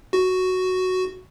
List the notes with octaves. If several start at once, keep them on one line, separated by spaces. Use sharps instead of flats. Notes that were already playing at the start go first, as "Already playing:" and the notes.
F#4